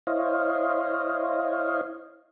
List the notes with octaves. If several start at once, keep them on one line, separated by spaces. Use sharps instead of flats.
E4 C5 C#5 D#5 F5